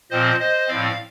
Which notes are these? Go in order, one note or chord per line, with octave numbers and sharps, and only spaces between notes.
A#2 F3 C4 C5 D#5
C5 D#5
A2 F3 C4 D5 F5